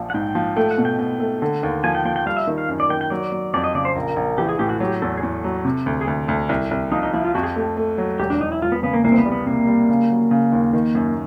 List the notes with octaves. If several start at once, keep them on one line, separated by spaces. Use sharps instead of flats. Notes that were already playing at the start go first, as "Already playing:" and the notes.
Already playing: A#1 F3
F#5
G#2 G5
F3
A3 G5
F#5
B2
G5
B2 G5
A3
D3
D#2
F3 G#5
G5
F3 G5
G5
G3 F5
E5
D#3
F5
F#2
D5
D#3 G5
G5
F#3 D5
F#3
F2 D5
D#5
C#3 D5
C5
A#1 A#4
A#1
E3 G4
G#4
A2 G4
F#4
F#3 G4
E2 A4
G#4
E2 A4
F#3
C3
D2
G#4
D2 A4
D2
C2
C2
F3 D#4
D#4
F3 E4
F4
F2 F#4
G#4
G4
A3
A3
F#3
E1 G4
D4
E1 D#4
E4
E1 F4
B3
C#3 B3
A#3
C2 A#3
C4
B3
G3
B3
C3 A#3
G3
C#3
F#3
C#3
D#2
D#3
F#2